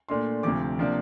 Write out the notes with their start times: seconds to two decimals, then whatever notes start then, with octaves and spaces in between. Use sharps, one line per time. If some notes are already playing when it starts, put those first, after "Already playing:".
0.09 A#2 A3 D4 C6
0.43 D2 C3 F3 D6
0.79 C3 F3 A#3 D4